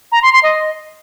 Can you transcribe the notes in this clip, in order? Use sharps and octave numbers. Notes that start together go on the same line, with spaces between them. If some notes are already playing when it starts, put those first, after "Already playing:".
A#5
C6
C6
D#5